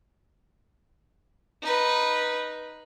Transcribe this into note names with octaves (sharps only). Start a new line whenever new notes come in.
D#4 B4